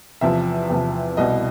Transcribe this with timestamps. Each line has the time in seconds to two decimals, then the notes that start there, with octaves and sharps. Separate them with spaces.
0.21 E2 C3 F3 E5
0.70 E2 C3 F3
1.17 C2 B2 D#5